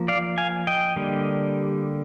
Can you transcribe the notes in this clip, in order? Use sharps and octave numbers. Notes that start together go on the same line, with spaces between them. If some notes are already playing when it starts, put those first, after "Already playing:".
Already playing: F3 A#3
D5 F5
F5 G#5
D#5 G5
D3 G3 A#3